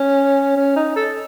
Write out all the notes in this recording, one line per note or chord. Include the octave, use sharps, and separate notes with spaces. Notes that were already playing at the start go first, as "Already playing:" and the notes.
Already playing: C#4
C#4
D#4
A4